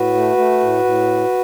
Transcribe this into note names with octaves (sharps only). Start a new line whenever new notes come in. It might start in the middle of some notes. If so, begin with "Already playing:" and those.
Already playing: A2 F#4 B4
A3
A3
A2
A2